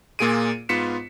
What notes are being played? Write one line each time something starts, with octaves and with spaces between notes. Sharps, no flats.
A#2 A#3 F4 G#4 D7 D#7
G#2 B3 F4 B6 C#7 E7